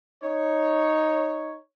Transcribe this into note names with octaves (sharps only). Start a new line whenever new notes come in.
D#4 C#5